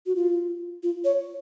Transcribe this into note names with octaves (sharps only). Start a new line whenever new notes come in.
F#4
F4
F4
C#5